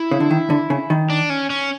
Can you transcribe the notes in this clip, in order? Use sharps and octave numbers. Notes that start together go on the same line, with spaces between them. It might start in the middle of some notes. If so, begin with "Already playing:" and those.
Already playing: E4
C#3
D3
D#3
D3
C#3
D#3
D4
C#4
C#4